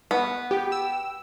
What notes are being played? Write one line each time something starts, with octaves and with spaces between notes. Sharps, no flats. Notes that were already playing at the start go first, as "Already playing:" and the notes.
B3
G4 G5
E6